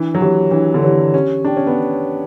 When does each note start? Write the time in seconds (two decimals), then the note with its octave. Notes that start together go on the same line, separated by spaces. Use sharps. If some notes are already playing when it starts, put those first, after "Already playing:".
Already playing: E3 D4
0.15 F#3
0.21 E3 G4 C#5
0.51 E3 D4
0.74 D3
0.83 E3 G4 C#5
1.14 C#4 G4
1.44 D4 C#5 G5
1.57 C#4
1.67 B3